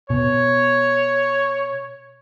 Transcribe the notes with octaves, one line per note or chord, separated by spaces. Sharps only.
B2 C#5